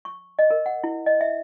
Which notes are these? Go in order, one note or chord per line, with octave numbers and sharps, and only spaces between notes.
C#6
D#5
A#4
F#5
E4
D#5
E5